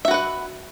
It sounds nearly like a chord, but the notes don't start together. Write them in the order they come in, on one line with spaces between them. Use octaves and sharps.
E5 F#4 B4 F#5